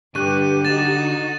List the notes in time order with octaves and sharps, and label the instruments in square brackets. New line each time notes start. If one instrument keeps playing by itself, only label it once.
[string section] G2 [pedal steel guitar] D3 C#6 F#6 [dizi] G4 [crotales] D#7
[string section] D#4 F#4 [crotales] A6 E7